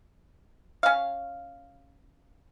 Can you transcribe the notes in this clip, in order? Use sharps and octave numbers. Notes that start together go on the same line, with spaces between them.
C#4 F5